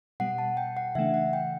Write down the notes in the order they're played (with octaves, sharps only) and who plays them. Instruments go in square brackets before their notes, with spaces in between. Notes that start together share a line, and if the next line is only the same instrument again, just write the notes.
[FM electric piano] B2 G3 B3 [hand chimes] F#5
[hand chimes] A5
G5
F#5
[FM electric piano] C#3 E3 A3 D4 [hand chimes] E5
[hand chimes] F#5
G5